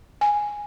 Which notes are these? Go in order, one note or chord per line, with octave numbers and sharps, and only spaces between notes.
G#5